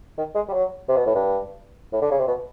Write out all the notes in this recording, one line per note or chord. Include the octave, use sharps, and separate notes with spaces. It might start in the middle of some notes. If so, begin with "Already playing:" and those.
D#3
G#3
G3
F#3
C3
B2
A2
G2
A2
D3
C#3
C3
B2